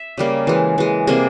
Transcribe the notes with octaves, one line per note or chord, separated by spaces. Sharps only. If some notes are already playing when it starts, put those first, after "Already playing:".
Already playing: E5
C#3 G3 A#3
E3 G#3
E3 G#3
C3 G3 A#3 G#4